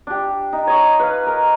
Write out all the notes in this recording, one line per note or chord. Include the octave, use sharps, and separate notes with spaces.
D4 G4
D#4
C#5 D#5 C#6
B4 F5
A#4